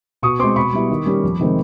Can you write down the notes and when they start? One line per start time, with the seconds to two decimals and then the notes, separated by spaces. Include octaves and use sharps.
0.22 B2 C#6 D#6
0.39 G#3 C4 C6 D6
0.56 B2 B5 C#6
0.73 G3 B3 E4
0.90 D#3
1.06 G3 A#3 C#4
1.23 F2
1.39 C3 D#3 G#3 C4